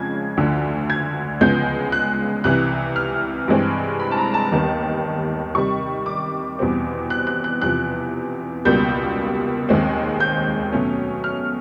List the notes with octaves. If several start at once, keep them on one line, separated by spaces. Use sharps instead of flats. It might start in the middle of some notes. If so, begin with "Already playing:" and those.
Already playing: F2 C#3 F3 G#3 G#6
D2 D3 F3
G#6
C#2 C#3 F3 G#3 B3 G6
F#6
C2 C3 E3 F#6
F6
G2 E3 G#3 C4
B5
A5
A#5
A5
D#2 D#3 G3 B3
C3 D#3 G3 C#6
D6
E2 B2 G3 C4
F#6
F#6
F#6
E2 C3 F3 F#6
C#2 B2 G3 A#3 G6
D#2 D#3 G#3 C4
G6
B2 F#3 A3 C#4
F6